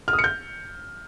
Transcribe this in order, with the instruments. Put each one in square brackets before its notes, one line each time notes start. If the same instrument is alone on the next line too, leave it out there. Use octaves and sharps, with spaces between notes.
[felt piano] F6
D#6
C#7
G6